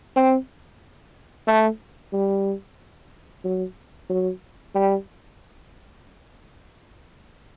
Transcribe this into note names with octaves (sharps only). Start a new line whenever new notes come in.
C4
A3
G3
F#3
F#3
G3